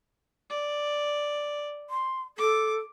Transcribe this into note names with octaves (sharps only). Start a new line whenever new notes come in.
D5
C6
A4 D6